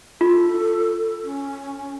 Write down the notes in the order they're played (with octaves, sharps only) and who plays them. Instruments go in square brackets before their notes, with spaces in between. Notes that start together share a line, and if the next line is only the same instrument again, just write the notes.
[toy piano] F4 [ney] A4
[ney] C#4